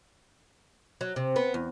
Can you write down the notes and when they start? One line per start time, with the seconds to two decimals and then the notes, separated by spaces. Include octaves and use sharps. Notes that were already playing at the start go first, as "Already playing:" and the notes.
1.01 F#3
1.16 C3
1.36 B3
1.54 E2